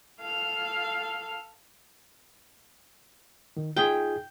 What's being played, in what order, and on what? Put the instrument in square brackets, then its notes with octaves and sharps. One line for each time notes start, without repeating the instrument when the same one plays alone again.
[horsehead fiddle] A4 F5
[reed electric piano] D#3
[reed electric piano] D#4 F4 G#4 [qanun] G5